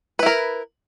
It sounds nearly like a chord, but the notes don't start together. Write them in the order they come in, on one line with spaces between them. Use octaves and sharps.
B4 E4 A#4